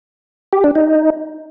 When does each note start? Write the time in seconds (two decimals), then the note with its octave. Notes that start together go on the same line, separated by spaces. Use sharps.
0.53 G4
0.64 D4
0.75 D#4